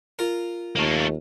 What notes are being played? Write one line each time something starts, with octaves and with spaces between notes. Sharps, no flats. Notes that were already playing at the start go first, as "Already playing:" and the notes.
F4 A#4
D#2 A3 A#3